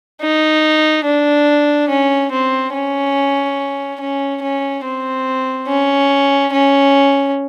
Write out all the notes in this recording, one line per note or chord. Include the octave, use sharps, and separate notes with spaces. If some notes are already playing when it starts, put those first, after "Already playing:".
D#4
D4
C#4
C4
C#4
C#4
C#4
C4
C#4
C#4